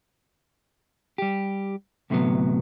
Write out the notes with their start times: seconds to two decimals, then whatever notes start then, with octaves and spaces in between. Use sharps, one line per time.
1.18 G3 G4
2.10 D2 A2 C3 D#3 F#3 B3